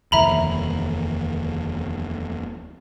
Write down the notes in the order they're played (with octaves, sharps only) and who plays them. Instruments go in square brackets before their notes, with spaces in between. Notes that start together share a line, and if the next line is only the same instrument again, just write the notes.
[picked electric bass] F1 D#2 E3 [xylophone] E5 A#5 B5